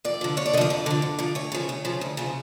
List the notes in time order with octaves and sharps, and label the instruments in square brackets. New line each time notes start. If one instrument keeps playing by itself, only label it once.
[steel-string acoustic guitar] F2 D5
D3 F3
F2 C#5
D5
D3 D#5
F3 D5
F2 D5
D3 F3
F2
D3 F3
D2 C#5
C#3 F3
D2
C#3 F3
D2
C#3 F3